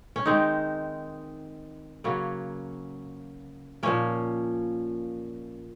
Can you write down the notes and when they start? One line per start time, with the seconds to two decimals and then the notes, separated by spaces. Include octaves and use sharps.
0.16 C#4
0.26 D#3 G#3 C4 D#4
2.04 C#3 F#3 A#3 C#4
3.83 A#2 F3 A#3 C#4